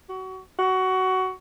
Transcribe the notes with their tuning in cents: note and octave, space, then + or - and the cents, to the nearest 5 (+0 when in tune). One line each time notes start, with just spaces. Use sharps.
F#4 +25
F#4 +15